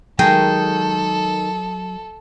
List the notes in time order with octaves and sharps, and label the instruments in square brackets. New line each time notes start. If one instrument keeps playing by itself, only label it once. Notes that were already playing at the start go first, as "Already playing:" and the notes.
[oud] D#3 G#3 [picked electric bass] F#3 [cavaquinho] G#4 G5 [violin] A4